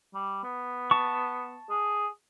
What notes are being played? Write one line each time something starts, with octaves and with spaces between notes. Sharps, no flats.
G3
B3
A5 C#6
G#4